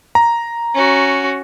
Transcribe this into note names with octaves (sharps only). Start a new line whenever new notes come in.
A#5
C#4 F#4